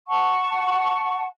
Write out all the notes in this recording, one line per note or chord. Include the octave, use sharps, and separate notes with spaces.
F#5 A5 C#6